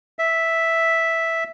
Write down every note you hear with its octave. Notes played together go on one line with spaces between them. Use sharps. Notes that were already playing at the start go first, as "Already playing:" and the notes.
E5